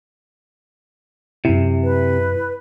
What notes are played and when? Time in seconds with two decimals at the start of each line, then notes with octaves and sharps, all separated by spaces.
1.45 F#2 C3 E4
1.83 B4